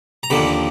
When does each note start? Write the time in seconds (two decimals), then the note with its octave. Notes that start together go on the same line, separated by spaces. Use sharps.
0.23 A#5
0.30 D#2 D3 F3 A#3 B5